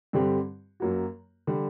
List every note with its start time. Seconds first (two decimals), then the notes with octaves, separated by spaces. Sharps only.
0.13 G2 D3 G3 C4 G4
0.80 F#2 F#3 A#3 F#4
1.47 D3 G3